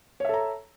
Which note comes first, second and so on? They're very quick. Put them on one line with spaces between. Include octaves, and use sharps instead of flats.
C#5 E5 A4 A#5